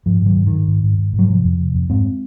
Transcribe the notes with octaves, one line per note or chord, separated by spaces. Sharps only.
G#2 F3
G#2 D#3 F#3
G#2
G#2 D#3
G#2
G#2
G#2
G#2
F#3
C3 F3
F2
C3
F2
G#2 G#3 C4